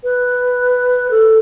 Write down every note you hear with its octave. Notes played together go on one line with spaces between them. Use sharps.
B4
A4